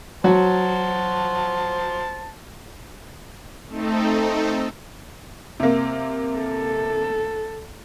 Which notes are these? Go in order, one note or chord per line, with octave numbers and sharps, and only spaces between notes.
F#3 F#4 C5 A5
A3 C4 D#4 A4
C3 A#3
A4